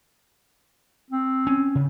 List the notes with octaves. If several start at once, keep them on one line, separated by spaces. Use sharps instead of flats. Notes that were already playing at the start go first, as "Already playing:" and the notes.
C4
C#4
C#3